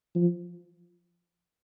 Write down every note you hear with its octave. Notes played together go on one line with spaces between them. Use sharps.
F3